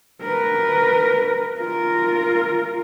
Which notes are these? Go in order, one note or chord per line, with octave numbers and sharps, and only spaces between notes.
A#4 B4
F4 A#4